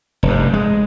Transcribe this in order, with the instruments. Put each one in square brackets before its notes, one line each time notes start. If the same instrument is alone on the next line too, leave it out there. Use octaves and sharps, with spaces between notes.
[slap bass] F1 G2
G#3